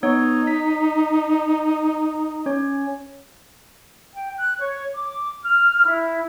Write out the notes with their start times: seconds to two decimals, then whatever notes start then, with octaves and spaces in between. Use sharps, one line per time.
0.03 B3 D#4 C#5
0.47 B6
2.46 C#4 C#5
4.13 G5
4.36 F#6
4.59 C#5
4.94 D6
5.43 F6
5.84 E4